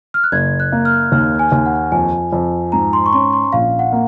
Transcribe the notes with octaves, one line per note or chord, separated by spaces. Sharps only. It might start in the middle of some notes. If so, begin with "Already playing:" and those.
F6
F#6
F#1 G#6
F#6
A#3
F6
D#2 F6
G#5
D#2
F#5
F2 G#5
F2
G#2 A#5
C6
C#6
C#4 C6
C6
A#1 F5
F#5
A#3